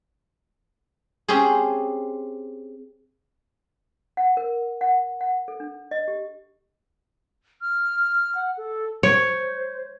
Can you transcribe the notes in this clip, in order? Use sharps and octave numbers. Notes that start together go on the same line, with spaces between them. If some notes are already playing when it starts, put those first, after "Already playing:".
C4 C#4 G4 G#4
F#5
A#4
F#5
F#5
A4
D4
D#5
G4
F6
F#5
A4
C5 C#5